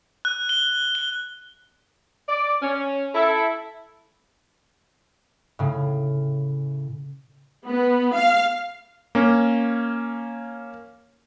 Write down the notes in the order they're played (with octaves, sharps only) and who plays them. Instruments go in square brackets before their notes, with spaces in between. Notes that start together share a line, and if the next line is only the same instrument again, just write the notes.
[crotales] F#6
G7
G7
[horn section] D5
C#4
E4 A4
[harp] A2 C#3
[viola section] B3
F5
[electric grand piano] A#3 C#4